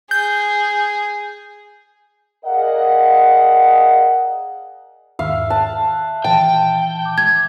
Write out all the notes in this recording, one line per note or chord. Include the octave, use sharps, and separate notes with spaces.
G#4 G6
G#4 A#4 D5 D#5 F5 F#5
E2 G#2 D#3 E5 F5
A5 F#6
A#2 D#3 E3 G5 A5
D6 G6
G#6